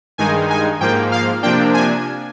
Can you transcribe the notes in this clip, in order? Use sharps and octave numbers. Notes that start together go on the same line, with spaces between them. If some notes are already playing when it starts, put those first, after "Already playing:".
G2 D#3 G#3 D#4 G#5
G#5
G#2 F3 A#3 G5
F5
C3 F3 A#3 D4 G5
G#5